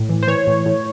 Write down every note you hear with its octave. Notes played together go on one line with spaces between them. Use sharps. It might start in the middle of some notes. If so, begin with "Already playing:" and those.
Already playing: A2
E3
C5
E3 C#5
A2
A2